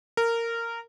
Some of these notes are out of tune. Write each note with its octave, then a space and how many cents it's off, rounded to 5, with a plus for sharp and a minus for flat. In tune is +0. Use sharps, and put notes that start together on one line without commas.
A#4 -15